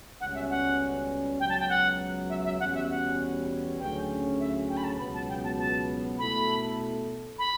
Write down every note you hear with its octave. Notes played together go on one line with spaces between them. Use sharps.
C#2 B2 G3 C#4 F#5
E5
F#5
C#2 B2 F#3 G5
A5
G5
F#5
E5
E5
E2 B2 G3 C#4 F#5
E5
F#5
D2 C#3 F#3 C#4 G5
E5
G5
B5
A5
C#2 B2 F#3 B3 B5
A5
G5
A5
A5
B2 A3 E4 A4 B5
B5